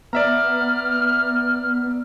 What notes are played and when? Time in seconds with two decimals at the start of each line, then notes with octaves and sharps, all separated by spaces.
0.13 B3 D5 E5 A#5 F6